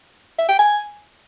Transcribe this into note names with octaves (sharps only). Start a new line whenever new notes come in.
E5
G5
G#5